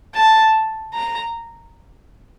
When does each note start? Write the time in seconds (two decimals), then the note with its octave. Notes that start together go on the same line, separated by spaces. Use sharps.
0.15 A5
0.94 A#5